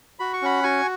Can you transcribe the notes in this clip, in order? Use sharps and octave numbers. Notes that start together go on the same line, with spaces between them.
F#4 B5
C#6
C#4 F#5 B5
F#4 G#5 C#6